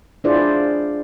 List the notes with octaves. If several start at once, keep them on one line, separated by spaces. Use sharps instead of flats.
D4 E4 F4 G#4 C5 D5